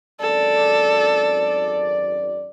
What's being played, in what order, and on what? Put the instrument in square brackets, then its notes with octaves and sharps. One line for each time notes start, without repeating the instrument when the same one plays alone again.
[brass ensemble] G#1 F#2 D5 [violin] A4